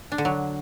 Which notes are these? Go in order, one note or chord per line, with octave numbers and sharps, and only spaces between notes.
D4
D3
F#3